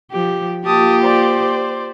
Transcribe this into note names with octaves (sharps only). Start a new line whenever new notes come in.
F3 G4
A#3 F4 G4 A5 D#6
C5 D5